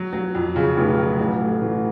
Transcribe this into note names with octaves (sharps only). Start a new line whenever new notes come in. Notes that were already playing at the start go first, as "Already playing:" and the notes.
Already playing: F#3
F#3
F2
C#3
F1
F#3
A1
A3
A1